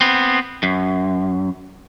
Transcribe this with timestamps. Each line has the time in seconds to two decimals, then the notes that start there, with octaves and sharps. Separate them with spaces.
0.01 B3 C4
0.63 F#2